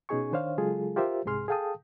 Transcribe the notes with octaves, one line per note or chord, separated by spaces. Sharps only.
B2 C#4 D#4 G#4 G#5 C#6
D#3 D4 C5 C#5 F5
C#3 F#3 G#3 F4 G#4 A4
F4 G4 A#4 C5 E5
C2 G#2 C3 G#4 C6 F6
G#4 A4 F5 G5 A5 D#6